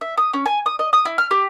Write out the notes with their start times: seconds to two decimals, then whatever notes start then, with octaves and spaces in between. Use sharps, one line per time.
0.01 E5
0.18 D#6
0.33 C#4
0.46 G#5
0.66 D#6
0.79 D#5
0.93 D#6
1.05 E4
1.18 F6
1.31 G4